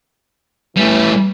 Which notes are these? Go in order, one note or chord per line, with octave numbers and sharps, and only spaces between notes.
A1 A2 E3 G3 A3